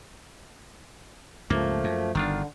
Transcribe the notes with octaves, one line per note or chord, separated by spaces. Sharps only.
C#2 G2 F3 A3 A#3
F#2
G1 D3 D#3 D4 F4